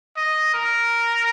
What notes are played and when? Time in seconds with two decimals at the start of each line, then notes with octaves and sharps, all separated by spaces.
0.17 D#5
0.54 A#4